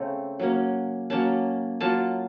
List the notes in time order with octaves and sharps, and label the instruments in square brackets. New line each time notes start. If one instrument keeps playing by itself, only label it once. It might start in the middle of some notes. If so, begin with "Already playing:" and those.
Already playing: [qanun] C#3 A3 C4
F#3 A#3 C#4
F#3 A#3 C#4 A5
F#3 A#3 F4 A5